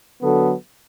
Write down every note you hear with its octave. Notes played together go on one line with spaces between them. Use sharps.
D3 F#3 B3 F#4 A4